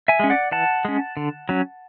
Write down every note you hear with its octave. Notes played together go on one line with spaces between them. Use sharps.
E5 G#5
G#3 C#4
D5 F#5
E3 F#5 A5
G#3 C#4
D3
F#3 C#4